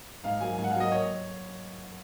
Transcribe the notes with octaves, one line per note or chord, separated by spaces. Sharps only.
G#2 F5
F#3 A#3 G#5
G#2 G#5
F#5
F5
F#3 A#3 D#5
C#5